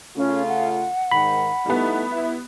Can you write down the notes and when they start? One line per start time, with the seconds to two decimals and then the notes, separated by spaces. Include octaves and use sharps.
0.17 C#3 A3 C#4 F4
0.48 F#5
1.11 G#2 D#3 B5
1.66 G3 A3 B3 D#4 E4
2.11 E4